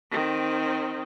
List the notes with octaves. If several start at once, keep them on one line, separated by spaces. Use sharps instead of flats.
D#3 C4